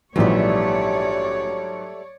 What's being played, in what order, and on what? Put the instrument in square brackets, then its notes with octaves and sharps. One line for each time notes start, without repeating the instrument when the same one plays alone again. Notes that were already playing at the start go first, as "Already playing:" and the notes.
[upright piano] A#1 E3 [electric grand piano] G#2 F#3 [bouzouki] G3 A3 [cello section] C#5 D5